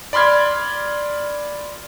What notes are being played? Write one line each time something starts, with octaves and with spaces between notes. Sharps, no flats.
D5 B5 C6 F6 G#6